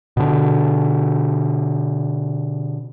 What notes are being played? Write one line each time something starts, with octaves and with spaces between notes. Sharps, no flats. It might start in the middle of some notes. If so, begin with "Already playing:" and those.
B2 D3